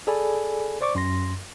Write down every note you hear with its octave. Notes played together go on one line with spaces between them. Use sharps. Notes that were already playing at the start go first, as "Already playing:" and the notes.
G#4 A4 D5 G#5 B5
C5 D5 C#6 D6
F#2 C6 A#6